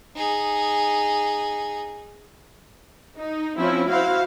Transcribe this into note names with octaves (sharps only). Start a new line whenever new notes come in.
D#4 G#4
D#4
F3 C4 C#4 E4
E4 F#4 C5 F5